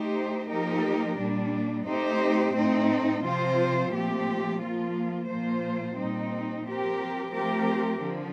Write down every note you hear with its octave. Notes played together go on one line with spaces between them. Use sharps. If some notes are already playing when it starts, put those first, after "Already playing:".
Already playing: A3 D#4 G4 C5
F3 A#3 D#4 G4 A#4
A#2 G3 D4
A3 C4 D#4 G4 C5
A2 A3 C4 D#4
C3 F3 C4 F4 C5
A#2 F3 A3 C4 G4
F3 A#3 F4
A#2 F3 A#3 F4 C5
A#2 G3 C4 D#4
F3 C4 G4 A#4
F3 A3 C4 G4 A#4
D3 F3